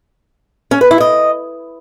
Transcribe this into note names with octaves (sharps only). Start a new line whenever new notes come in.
C#4
B4
E4
D#5